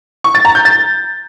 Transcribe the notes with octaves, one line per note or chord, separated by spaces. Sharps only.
C#6
A6
A#5
G6
A6